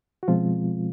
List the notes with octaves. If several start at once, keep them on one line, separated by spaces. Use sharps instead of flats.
F#4
B2 F3 G#3 C4 F4